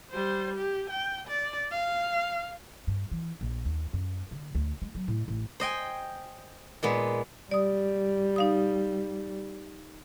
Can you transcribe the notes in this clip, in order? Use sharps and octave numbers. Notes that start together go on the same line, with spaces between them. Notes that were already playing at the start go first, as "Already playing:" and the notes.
G3 C5
G4
G5
D5
F5
G2
E3
A#1
D#2
F#2
D3
D2
G#3
F#3
A2
A1
C5 D#5 G5 G#5
A#2 G#3 B3
G3 D5 D#6
D#4 F5 D#6